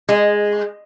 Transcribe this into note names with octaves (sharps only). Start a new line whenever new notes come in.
G#3